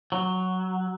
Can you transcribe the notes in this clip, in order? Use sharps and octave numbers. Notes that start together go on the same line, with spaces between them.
F#3